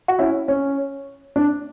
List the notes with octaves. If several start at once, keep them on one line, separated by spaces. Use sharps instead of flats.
F#4
C#4 E4
C#4
D4